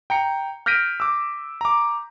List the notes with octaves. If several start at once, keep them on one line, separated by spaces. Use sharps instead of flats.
G5 A#5 C#7
F6 G6 A#6 B6 D7 D#7
D6 E6
A#5 D6